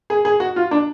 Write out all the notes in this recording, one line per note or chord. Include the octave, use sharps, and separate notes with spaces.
G#4
G#4
F#4
F4
D4